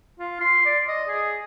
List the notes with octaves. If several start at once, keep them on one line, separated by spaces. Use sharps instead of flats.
F4
C6
D5
D#5
G#4